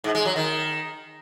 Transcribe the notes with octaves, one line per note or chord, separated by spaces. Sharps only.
G#2
G#3
F#3
D#3